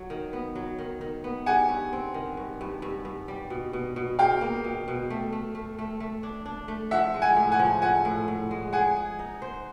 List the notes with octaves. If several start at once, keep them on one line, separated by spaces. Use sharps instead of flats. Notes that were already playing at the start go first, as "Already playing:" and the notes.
Already playing: F#3
D#3
B3
F#3
D#3
D#3
B3
G3 F#5 G#5
G2
C4
D#3
G2
G2
G2
G2
G3
B2
B2
B2
B2 F5 G5
A#3
B2
B2
A3
A3
A3
A3
A3
D4
D4
A3
F3 E5 F#5
G#3
F#5 G#5
A2
F#5 G#5
F3
F3 F#5 G#5
A2
A2
G#3
G#4 F#5 G#5
G#4
D#4
C5